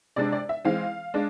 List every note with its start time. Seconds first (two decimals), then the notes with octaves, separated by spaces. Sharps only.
0.16 C3 G#3 D4 D5
0.32 D5
0.49 E5
0.65 E3 G#3 C4 F5
1.14 G#3 D4